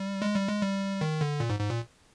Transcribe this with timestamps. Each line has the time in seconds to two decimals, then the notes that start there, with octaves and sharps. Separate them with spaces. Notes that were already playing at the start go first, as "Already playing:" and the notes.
Already playing: G3
0.22 G#3
0.34 G3
0.48 G#3
0.61 G3
1.01 D#3
1.21 D3
1.40 A#2
1.50 G#2
1.60 G#2
1.70 A#2